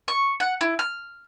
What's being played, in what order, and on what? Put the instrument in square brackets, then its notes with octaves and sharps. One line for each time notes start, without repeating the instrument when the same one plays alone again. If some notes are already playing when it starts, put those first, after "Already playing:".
[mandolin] C#6
F#5
E4
F6